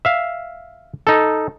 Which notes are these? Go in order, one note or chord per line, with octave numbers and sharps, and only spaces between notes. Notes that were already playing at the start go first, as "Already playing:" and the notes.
E5 F5
D#4 A4